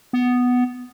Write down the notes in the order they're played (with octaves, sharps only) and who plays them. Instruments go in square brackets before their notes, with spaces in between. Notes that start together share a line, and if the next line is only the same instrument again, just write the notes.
[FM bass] B3